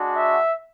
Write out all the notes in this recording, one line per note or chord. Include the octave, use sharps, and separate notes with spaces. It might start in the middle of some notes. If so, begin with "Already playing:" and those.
Already playing: G#3 D4 F#4
E5